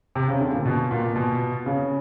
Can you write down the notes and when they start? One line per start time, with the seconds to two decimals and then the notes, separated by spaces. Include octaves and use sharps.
0.15 C3
0.28 C#3
0.41 D3
0.53 A#2
0.65 B2
0.91 A#2
1.16 B2
1.66 C#3